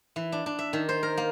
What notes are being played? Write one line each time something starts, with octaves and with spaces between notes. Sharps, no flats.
E3
D4
D4
E5
D#3
C5
A#4
A#3